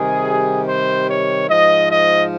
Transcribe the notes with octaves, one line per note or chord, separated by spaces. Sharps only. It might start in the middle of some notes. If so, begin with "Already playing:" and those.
Already playing: C3 D#3 G3 G#4
C5
C#5
G#2 F3 D#5
D#5